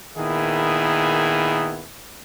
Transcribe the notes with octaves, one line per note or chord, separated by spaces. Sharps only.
A#2 D#3 B3 E4 G#4